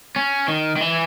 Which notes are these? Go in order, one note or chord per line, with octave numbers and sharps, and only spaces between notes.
C#4
D#3
D#3
E3